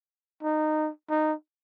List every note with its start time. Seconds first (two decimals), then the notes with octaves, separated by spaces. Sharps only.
0.43 D#4
1.10 D#4